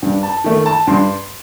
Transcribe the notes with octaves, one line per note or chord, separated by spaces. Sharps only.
G2
A5
D#3 A3
A5
G2 C6